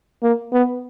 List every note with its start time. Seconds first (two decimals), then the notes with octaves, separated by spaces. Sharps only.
0.23 A#3
0.53 B3